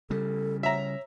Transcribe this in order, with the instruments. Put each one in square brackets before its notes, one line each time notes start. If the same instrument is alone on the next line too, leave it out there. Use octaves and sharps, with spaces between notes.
[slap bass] C#3 G3 [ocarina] A4
[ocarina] C#5 [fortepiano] E5 A#5